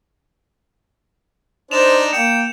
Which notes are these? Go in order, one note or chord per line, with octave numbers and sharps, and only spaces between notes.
D4 D#4 C5 E7 F7
A#3 G5 C#7